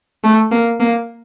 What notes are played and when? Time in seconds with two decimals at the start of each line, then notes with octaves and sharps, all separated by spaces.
0.24 A3
0.52 A#3
0.80 A#3